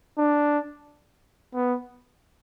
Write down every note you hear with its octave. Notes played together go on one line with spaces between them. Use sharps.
D4
B3